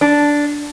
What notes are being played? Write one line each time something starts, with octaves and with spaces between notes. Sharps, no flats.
D4